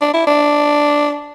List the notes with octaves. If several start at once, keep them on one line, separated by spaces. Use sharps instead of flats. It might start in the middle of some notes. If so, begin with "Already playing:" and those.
D4
E4
D4